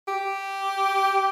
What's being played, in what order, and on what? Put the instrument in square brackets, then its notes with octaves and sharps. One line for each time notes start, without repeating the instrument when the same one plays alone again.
[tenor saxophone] G4